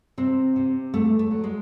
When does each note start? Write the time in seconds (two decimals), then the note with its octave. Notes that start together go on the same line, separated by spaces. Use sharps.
0.18 C3 C4
0.56 C3
0.93 E2 A3
1.19 A3
1.31 F#3
1.44 G#3